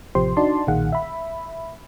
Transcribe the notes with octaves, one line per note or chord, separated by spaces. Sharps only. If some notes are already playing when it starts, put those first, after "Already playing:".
A1 C3 F3 G4 C5 C6
D4 D#4 F#4 D5 A5 C6
B1 A#2 D#3 G#4 F5 F#5
E5 B5